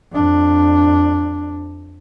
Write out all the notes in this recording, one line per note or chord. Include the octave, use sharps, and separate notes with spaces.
F2 D4